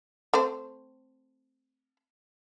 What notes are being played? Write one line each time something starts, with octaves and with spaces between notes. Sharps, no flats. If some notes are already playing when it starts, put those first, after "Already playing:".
A3 C4 C5